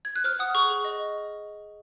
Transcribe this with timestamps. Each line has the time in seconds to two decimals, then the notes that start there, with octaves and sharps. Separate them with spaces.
0.05 G#6
0.16 F#6
0.24 C5 F6
0.39 F#5 D#6
0.55 G#4 C#6
0.70 G#4
0.85 D#5